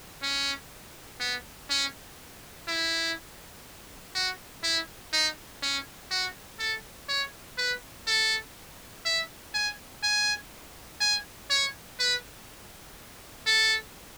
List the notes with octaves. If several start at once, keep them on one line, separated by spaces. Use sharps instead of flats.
C#4
B3
C#4
E4
F#4
E4
D#4
C#4
F#4
A4
C#5
B4
A4
E5
G#5
G#5
G#5
C#5
B4
A4